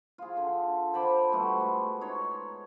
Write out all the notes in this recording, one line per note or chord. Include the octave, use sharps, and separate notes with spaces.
F4 G#4
D3
C5 A5 B5 D6
B2 G3 A3 F#4
G#3
D#4 C#5 C6